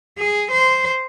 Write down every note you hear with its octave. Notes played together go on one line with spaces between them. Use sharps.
G#4
C5